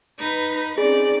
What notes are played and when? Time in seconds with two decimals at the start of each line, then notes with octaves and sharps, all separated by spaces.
0.20 D#4 B4
0.78 C4 C#4 D#4 G#4 D5